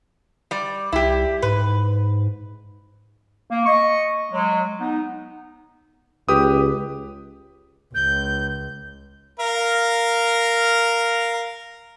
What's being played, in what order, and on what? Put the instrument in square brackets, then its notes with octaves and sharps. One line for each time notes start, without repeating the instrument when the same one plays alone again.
[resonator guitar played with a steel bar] G3 D5
[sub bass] C2 [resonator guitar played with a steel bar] E4 G4
[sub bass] G#2 [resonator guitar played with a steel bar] B4
[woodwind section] A#3
D#5 C#6
F#3 G#3
B3 D#4
[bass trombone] C#2 [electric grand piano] G4 B4 D#6
[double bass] C#2 [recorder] G6
[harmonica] A#4 F5 A#5